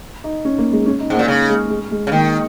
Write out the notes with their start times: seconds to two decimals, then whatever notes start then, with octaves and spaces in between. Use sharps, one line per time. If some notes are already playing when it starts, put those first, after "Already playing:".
0.24 D#4
0.45 C#4
0.58 A#3
0.72 G#3
0.86 C#4
1.00 D#4
1.10 G#2
1.14 A#3
1.19 A#2
1.28 C#3
1.49 G#3
1.70 G#3
1.91 G#3
2.07 C#3
2.11 D#3 A#3